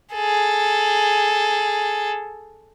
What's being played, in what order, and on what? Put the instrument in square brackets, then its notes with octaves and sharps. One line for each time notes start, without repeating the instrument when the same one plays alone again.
[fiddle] G#4 A4